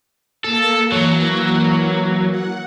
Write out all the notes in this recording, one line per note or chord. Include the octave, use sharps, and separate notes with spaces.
A#3 A4 A5
E3 F#3 A#3
F#5